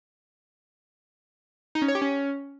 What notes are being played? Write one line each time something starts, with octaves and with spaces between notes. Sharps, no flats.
D#4
C#4
C#5
G4
C#4